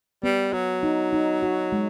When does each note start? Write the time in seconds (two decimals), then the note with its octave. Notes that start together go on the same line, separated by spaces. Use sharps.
0.23 G3 B3
0.53 F#3 F#4
0.83 D#4
1.13 D#4
1.43 F#4
1.72 G#3